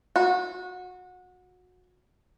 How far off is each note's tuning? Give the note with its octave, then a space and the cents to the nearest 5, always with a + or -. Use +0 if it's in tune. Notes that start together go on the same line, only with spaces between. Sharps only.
F#4 -25